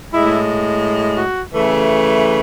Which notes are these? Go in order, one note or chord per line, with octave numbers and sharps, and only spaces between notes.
A2 G#3 E4
F#4
C#3 E3 A3 A4